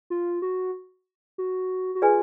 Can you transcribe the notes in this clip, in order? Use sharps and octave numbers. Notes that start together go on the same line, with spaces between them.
F4
F#4
F#4
F#4
F4 G#4 B4 D5 G#5